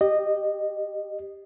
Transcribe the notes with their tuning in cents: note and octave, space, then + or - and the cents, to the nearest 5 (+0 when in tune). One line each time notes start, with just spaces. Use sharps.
G4 +0 D#5 -15